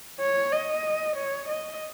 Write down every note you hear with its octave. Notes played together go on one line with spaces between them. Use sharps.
C#5
D#5
C#5
D#5